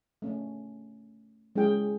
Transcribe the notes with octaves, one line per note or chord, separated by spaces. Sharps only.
A3 C#4
G#3 C#4 E4 G#4 G5